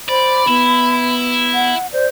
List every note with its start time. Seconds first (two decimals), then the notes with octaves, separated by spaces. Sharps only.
0.09 C5 D5 B5
0.48 B3 E4
1.54 F#5
1.93 C5 D5